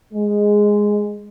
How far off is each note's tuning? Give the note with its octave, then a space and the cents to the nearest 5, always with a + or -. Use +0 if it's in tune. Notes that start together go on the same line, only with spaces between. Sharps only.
G#3 -5